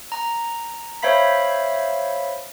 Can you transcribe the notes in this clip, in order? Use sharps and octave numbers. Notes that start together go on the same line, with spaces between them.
A#5
C5 C#5 E5 F5 B5 B6